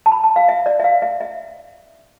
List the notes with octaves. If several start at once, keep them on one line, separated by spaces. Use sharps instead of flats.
A5
B5
A5
F5
E5
D5
E5
F5
E5
E5